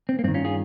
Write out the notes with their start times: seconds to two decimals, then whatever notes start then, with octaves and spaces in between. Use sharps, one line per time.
0.09 C4
0.19 A#3
0.24 G2 D#3 C4
0.34 C#4 F4
0.45 F4 G#4